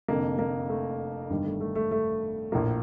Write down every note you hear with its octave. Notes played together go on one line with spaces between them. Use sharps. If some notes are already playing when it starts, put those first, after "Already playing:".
F1 F2 D3 A#3
A#3
A3
G1 G2 D#3 G3
A3
A3
A3
A3
A#1 A2 F3 A#3